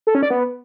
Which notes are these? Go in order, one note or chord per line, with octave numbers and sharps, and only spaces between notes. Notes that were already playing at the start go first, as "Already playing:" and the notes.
A4
C#4
D5
B3